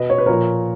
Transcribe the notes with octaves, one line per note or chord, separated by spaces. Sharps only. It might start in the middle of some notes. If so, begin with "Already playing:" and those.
Already playing: B2 B4 D#5
C#5
B4
A#2 F3 A#4 C#5